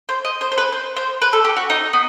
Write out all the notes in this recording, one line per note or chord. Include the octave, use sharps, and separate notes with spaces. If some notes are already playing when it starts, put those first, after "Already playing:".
C5
D#5
C5
C5
B4
C5
C5
B4
A4
G4
F#4
D#4
B3